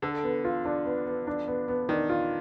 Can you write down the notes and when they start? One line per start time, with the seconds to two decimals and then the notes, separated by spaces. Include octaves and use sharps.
0.02 D3 A4
0.24 B3
0.44 F4
0.65 D4
0.86 B3
1.06 B3
1.27 D4
1.48 B3
1.68 B3
1.89 D#3 D4
2.09 F4